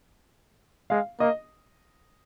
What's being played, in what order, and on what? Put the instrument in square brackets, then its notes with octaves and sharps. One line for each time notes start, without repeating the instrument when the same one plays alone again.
[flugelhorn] G#3 [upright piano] F5
[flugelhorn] A#3 [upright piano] D#5